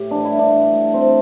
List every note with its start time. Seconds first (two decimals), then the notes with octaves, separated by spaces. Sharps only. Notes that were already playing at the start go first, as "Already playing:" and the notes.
Already playing: A2 G4
0.11 E3 D4
0.25 E4
0.32 G3
0.39 D4
0.53 A2
0.73 A2
0.94 G3 C4